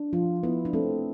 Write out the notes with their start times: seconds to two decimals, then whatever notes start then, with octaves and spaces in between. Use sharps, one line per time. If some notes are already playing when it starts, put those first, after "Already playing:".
Already playing: D4
0.13 F3 F4
0.43 B3 E4
0.65 D4
0.73 A3 C4